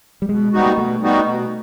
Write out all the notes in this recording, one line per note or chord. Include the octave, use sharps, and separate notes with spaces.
G3
B2 G#3
G3 B3 D#4 F#4
A#3
B2 A3
G3 B3 D#4 F#4
B2